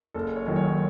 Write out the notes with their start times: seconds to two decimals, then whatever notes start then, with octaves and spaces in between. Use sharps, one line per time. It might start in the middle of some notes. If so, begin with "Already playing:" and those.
0.14 F#1 A4
0.36 C#5
0.46 F#2 D#3 F#3
0.56 C#5